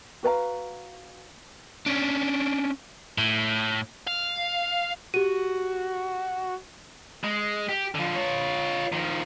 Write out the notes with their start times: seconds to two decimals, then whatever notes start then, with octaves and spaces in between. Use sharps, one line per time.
0.23 F#4 B4 F5 A#5
1.86 C#4 D4
3.18 A2
4.07 F5
5.14 F#4 G4 D#7
7.24 G#3
7.69 G4
7.95 D3 F3
8.15 F4 C#5
8.92 D#3 F3